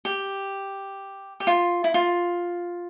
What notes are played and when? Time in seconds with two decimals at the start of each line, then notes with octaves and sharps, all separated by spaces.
0.05 G4
1.40 G4
1.47 F4
1.84 E4
1.94 F4